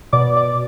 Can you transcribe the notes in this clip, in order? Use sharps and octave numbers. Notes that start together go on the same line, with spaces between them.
B2 D5 D6
D5 D6